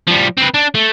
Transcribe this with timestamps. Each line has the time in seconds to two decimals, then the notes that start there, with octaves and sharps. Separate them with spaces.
0.07 F3 G3
0.37 C4 B4
0.54 D4
0.75 A3